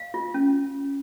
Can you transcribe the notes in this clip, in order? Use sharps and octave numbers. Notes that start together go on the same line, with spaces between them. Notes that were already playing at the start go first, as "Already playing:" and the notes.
Already playing: F5
F4
C#4